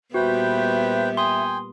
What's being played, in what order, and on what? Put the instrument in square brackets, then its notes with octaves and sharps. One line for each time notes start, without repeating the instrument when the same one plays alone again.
[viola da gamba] A#2 G3 B3 [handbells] F#4 [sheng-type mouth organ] B4 C5 G5 [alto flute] E5
[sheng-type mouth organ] G5 G#5 [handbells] C6 D#6